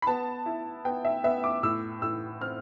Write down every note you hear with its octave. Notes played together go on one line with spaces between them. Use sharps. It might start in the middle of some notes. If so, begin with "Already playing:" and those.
B5
B3 A5
E4
B3 G5
E5
B3 E5
D6
A2 E6
A2 E6
C4 F6